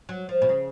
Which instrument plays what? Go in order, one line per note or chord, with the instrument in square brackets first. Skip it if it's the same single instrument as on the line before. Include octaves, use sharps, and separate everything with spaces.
[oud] F#3
F3
B2
C#3